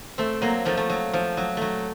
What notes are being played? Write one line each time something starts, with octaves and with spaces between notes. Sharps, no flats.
A3 C4
F#3 A#3
F3 A3
A3
F#3
F3
F#3
F#3 A3